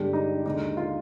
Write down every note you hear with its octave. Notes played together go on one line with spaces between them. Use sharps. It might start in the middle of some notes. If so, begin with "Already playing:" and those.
Already playing: G1 G2 D3 G#3 D4 G4
D#4
D#2 D3 G#3 D#4
F4